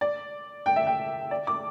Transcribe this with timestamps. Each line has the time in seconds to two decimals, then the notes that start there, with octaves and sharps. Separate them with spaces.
0.01 D5
0.66 G5
0.76 E5
0.87 G5
1.31 D5
1.47 D6